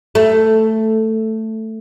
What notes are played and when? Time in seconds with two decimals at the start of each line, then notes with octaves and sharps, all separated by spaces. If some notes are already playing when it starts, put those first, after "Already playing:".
0.15 A3